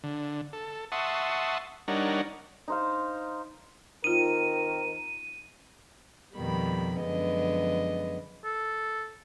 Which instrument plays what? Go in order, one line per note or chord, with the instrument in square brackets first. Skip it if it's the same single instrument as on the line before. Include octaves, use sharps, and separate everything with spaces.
[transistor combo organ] D3
A4
E5 F#5 A5 C6 C#6 D#6
G3 D4 D#4 A#4 C#5 F#5
[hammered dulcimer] D#4 C5 F5
[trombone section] D#3 C4 A#4 [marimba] D#4 F4 [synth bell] D#7
[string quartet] F2 B2 D#3 G3 B5
F#2 D3 F3 G#3 B3 D#5
[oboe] A4